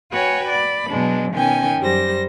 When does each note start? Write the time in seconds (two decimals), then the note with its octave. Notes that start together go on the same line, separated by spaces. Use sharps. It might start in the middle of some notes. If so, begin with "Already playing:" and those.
0.11 F#4 B4 C#5 G5 G#5
0.48 D5 B5
0.88 B2 F#3 G#3 D4
1.32 B2 D#3 C#4 G5 G#5
1.79 F#2 G3 C5 A#6